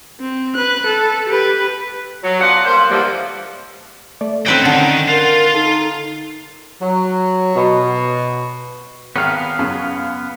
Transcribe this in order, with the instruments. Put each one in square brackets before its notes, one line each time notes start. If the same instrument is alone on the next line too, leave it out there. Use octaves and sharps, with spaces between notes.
[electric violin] C4
B4 F#6
A4
G4 B4
[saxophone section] F#3
B3 D4 F4 F#5
G2 A#3 C5
D3 E3 F3 G3 A#3
[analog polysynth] A3 D5
[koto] C4 B4 G5 [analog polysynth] C#4 D#4 [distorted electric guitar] D#5 F#5
[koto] D3 [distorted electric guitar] D#3
[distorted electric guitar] F4 [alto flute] A#4 [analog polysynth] F#5
[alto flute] D#4 [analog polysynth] A4
[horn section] F#3
B2
[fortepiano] G#1 [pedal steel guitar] B3 F5
[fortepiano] F#2 C#3